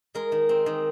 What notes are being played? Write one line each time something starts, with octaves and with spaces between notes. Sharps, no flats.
G#3 A#4
D#3
C4
D#3